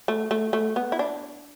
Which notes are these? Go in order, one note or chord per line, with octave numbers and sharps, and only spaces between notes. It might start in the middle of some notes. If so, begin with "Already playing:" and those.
A3
A3
A3
B3
E4
D4